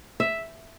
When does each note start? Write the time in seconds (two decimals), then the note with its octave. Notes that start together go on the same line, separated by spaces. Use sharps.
0.20 E5